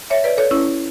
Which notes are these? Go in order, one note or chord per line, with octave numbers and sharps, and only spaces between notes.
C#5 E5
B4 D5
A4 C#5
C#4 E4